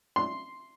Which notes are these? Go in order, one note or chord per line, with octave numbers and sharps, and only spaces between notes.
C6